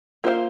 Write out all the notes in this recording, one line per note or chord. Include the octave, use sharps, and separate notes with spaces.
A#3 F4 C5 F5